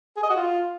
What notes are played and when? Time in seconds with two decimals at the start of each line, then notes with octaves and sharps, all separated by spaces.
0.17 G#4
0.23 D#5
0.30 F#4
0.36 F4